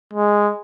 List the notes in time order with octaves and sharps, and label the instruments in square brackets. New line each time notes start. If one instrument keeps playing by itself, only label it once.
[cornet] G#3